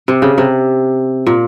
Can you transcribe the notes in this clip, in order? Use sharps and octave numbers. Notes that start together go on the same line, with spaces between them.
C3
C#3
C3
A#2